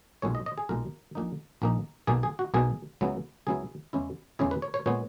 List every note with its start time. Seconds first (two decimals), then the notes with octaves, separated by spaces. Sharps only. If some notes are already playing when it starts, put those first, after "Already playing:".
0.22 B1 A#2 G#3 C#5
0.35 D#5
0.46 D#5
0.58 G#4
0.69 B1 A#2 G#3 A#4
1.15 A#1 A#2 A#3 D#4
1.62 A#1 A#2 A#3 D#4
2.07 B1 B2 A#3 G#4
2.23 G#4
2.39 F#4
2.54 B1 B2 A#3 G#4
3.01 C#2 C#3 F#3 B3 E4
3.47 C#2 C#3 F#3 B3 E4 G#4
3.93 E2 C#3 G#3 C#4 E4
4.39 E2 C#3 G#3 C#4 E4 G#4
4.51 B4
4.62 C#5
4.74 C#5
4.86 A#2 G#3 B3 C#5